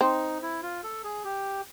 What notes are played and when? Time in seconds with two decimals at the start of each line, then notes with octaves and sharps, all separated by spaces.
0.01 C4 D#4
0.42 E4
0.63 F4
0.84 A4
1.04 G#4
1.24 G4